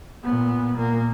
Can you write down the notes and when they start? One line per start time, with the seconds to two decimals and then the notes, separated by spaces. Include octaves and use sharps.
0.24 A#2 B3
0.75 A#2 A#3